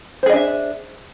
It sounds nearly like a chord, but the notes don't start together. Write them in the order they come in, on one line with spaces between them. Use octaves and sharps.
C5 G#4 D#5 D4 E5